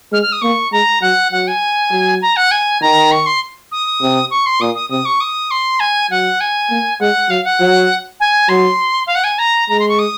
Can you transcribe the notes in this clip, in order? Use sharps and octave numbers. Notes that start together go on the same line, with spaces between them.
G#3 F6
F6
D#6
A#3 C#6
G#3 A#5
F#3 F#5
F#3 F#5
G#5
F#3
A#5
F#5
G#5
D#3 A#5
C#6
C6
D#6
C3
C#6
C6
A#2 D#6
D#6
C3 D#6
C#6
D#6
C6
G#5
F#3 F#5
G#5
A#3
G#3 F#5
F#3 F5
F#5
F#3
G#5
F#3 C6
F5
F#5
G#5
A#5
G#3 A#5
C6
C#6
D#6